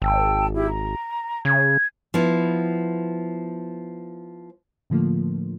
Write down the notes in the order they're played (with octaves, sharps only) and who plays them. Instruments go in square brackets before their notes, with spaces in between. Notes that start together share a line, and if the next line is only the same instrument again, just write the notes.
[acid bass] G#1 [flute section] G5 A5 E6
[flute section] E4 G4
A#5
[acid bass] C#3 [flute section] G#6
[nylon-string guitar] F3 B3 E4
[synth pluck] A2 D3 F3 A3 A#3